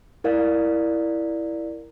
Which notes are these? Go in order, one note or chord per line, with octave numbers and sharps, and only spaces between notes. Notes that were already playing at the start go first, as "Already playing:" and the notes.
E4 A#4 D5 F5